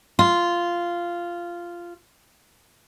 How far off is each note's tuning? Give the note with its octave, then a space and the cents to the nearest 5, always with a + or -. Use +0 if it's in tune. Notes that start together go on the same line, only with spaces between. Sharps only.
F4 -10